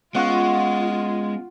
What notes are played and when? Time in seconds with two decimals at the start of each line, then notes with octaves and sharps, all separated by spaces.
0.15 G#3 B3 C#4 F4 F5 F#5 C#6 F#6